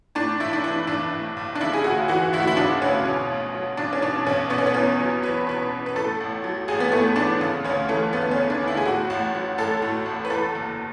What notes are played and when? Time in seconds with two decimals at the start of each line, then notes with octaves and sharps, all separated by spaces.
0.15 A2 D4
0.40 B1 E4
0.53 D4
0.64 E3 E4
0.87 B1 D4
1.12 A2
1.37 B1
1.56 D4
1.61 C#3 E4
1.73 G#4
1.84 D2 F#4
2.08 E3 F#4
2.33 D2 E4
2.40 F#4
2.47 E4
2.57 C#3 D4
2.81 D2 C#4
3.05 B2
3.30 B1
3.54 F#3
3.77 B1 D4
3.93 C#4
4.02 B2 D4
4.26 B1 C#4
4.50 B2 B3
4.58 C#4
4.66 B3
4.74 E2 C#4
4.99 F#3
5.22 E2 B4
5.47 B2 B4
5.72 E2
5.86 B4
5.95 A2 A4
6.20 A1
6.44 F#3
6.68 A1 G#4
6.80 B3
6.92 A2 A3
7.16 A1 D4
7.41 C#3
7.64 D2 C#4
7.89 E3 A3
8.13 D2 B3
8.31 C#4
8.37 C#3
8.50 D4
8.61 D2
8.68 E4
8.77 G#4
8.85 A2 F#4
9.10 A1
9.35 F#3
9.58 A1 A4
9.82 A2
10.06 A1
10.25 B4
10.30 E2 A4
10.55 F#1